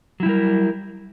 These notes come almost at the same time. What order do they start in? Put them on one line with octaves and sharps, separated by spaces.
F#3 E4 G3 A#4